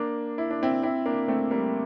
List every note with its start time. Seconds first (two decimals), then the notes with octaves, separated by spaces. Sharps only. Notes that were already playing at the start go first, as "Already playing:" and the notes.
Already playing: A#3 D4
0.38 E4
0.50 D4
0.63 C4 E4
0.83 C4 E4
1.06 A#3 D4
1.28 A3 C4
1.51 G3 A#3